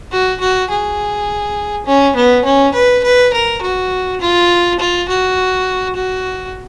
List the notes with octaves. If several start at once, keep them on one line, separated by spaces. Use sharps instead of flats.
F#4
F#4
G#4
C#4
B3
C#4
B4
B4
A#4
F#4
F4
F4
F#4
F#4